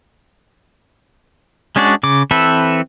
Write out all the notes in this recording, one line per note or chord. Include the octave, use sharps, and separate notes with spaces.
G#3 C#4 D4 F#4 D5
C#3 D6
E3 C4 A4 B4 E5